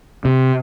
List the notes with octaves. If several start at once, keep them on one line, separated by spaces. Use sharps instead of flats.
C3